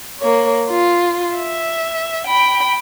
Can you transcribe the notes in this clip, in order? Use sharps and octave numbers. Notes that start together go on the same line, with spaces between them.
A#3 C#5
F4
E5
G5 B5